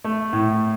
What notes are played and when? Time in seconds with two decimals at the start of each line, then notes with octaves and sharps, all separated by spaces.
0.04 A3
0.33 A2